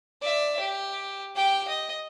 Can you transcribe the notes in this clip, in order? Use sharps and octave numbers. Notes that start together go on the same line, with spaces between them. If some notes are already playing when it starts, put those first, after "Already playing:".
D5 E5
G4
G4 G5
D#5